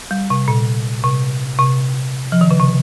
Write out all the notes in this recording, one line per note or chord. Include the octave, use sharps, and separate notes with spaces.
G3
C3
A#2
C3
C3
F3
D#3
C#3
C3